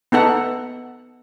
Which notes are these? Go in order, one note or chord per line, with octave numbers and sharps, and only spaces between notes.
B3 D#4 A4 F#5